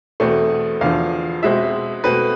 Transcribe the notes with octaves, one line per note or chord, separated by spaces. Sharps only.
E2 B2 A3 C4
E2 D3 F3 F5
B2 G#3 C4 E5
B2 A3 C4 B4